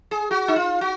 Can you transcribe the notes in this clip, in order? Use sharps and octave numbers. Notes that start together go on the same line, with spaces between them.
G#4
F#4
D#4
F4
F#4